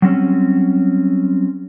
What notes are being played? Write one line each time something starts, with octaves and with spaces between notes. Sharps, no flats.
F#3 G3 C4 C#4